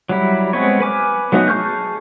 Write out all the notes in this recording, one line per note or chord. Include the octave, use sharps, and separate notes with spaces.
F#3 G3 E4
G#3 B3 C4 B4 C#5
B4 G#5 D6 F6
F#3 A3 B3 D#4 F#4
G#4 A5 C#6 F6 G6